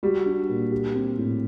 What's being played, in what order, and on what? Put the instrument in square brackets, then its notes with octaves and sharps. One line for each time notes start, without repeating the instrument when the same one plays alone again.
[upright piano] G3 [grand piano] F#4
[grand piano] D4
A#2
G4
C4
A2